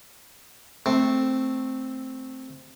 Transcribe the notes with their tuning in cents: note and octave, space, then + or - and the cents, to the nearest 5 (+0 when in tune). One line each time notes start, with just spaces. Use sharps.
A3 +0 C4 +0